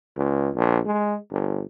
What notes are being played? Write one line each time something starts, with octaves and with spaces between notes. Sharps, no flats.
C#2
A#1
G#3
G1